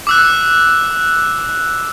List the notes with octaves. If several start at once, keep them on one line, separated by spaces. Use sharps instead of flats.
D6 E6 F#6